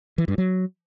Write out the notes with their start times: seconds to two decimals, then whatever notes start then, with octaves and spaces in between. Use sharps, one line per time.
0.18 E3
0.28 G2
0.38 F#3